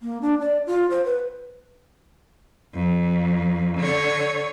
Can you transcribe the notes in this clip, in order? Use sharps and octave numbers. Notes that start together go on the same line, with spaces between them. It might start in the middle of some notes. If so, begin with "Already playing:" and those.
A#3
D4
D5
F4
C5
B4
F2
D3 C#5